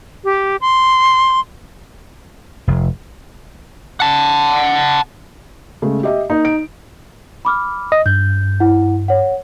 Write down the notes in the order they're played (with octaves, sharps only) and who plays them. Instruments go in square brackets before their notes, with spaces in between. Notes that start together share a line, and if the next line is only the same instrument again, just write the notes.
[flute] G4
C6
[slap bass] F1
[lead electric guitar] F#5 A5
[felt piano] C#3 G#3 A3
G4 D#5 E5
[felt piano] A#3 [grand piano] D#4
[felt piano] D7
[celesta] B5 D6 F6
[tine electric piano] D#5
[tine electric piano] G2 [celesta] G6
[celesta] E4 F#5
C#5 F#5